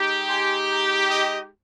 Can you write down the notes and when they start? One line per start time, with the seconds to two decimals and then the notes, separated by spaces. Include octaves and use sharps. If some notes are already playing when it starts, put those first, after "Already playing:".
Already playing: G#3 D#4 G4
0.29 G#5 C6
0.70 G5 A#5
1.11 D#5 G5